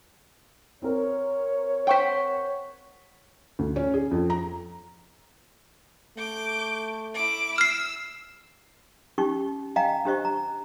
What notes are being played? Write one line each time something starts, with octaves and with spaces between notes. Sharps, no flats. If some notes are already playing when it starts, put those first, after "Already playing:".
C4 A#4 C#5
C5 F#5 G5 C#6 B6
D2
C#4
G#4
F2
A#5
A3 D6 G6
E4 D6
E6 F6 C7
C#4 D#4 G4 C#6
D#5 F5 G5 G#5 A#5
D4 G4 C5 D#5 C#6
A#5